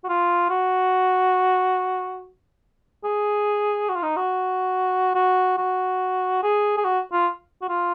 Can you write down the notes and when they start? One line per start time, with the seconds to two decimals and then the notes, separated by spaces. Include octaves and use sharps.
0.04 F#4
0.09 F4
0.50 F#4
3.04 G#4
3.89 F#4
3.96 F4
4.03 D#4
4.17 F#4
5.15 F#4
5.58 F#4
6.43 G#4
6.78 G#4
6.84 F#4
7.12 F4
7.62 F#4
7.69 F4